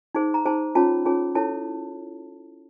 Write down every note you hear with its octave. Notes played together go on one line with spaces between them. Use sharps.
D#4 G#4 C5
A#5
D#4 G#4 C5 A5
C#4 F4 G#4 C#5 A5
C#4 F4 G#4 C#5 A5
E4 A4 C#5 A5